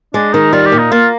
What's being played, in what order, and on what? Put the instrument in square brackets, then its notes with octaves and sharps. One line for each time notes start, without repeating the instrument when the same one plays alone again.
[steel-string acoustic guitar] G#3 [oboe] D4
[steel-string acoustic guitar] D#3 [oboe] D#4
[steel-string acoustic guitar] G3 [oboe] F4
[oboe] G4
[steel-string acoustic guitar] A#2
[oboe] D#4
[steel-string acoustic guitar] A#3 [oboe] F4